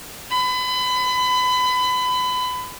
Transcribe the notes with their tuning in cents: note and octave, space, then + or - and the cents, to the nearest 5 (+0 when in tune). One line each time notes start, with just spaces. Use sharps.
B5 +30